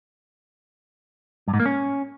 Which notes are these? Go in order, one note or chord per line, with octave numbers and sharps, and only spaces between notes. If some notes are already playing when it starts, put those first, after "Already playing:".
G2
G#2
A#3
C#4